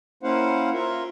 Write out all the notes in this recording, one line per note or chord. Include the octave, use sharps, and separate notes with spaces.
A#3 C#4 E4 C5 F5 F#5
F4 A#4 E5